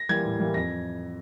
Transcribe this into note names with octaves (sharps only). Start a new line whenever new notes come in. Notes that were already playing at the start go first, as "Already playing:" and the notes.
Already playing: A#6
E3 G3 A#3 G#6
A2
E3 G3 A#3
F2 A#6